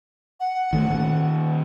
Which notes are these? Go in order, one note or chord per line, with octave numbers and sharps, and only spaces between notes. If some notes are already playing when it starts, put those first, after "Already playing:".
F#5
D#3 A3
A#2 D#3